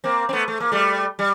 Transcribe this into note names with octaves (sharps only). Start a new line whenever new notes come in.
A#3 C4
C4
A3 B3
A3
A#3
G3 A3
G3